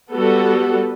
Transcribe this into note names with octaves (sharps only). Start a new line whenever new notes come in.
G3 B3 F#4 A4